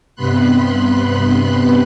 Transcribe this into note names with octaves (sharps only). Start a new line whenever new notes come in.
G2 C3 B3 B5 C6 F#6